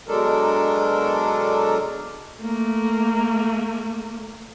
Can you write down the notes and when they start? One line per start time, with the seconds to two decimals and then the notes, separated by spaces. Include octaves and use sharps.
0.08 B2 F#3 G#3 D4 A4 A#4
2.40 A3 A#3